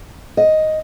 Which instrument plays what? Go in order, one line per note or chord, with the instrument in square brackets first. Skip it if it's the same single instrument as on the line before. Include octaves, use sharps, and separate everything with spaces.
[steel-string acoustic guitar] D#5